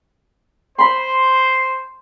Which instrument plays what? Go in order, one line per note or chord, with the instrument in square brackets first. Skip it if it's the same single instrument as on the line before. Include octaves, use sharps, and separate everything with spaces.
[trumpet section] C5 [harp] B5 C6